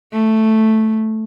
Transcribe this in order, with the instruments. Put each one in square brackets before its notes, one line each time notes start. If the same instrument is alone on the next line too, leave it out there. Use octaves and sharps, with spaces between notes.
[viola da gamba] A3